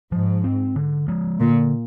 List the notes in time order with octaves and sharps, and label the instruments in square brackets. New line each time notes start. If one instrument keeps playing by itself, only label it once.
[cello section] G#2 [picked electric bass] F3
[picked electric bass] C4
D3
F3 G#3
[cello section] A#2 [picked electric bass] D3